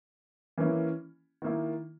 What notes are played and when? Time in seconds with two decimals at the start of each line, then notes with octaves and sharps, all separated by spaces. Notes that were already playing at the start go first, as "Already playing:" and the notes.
0.58 E3 A#3 C#4 E4
1.42 D#3 A#3 E4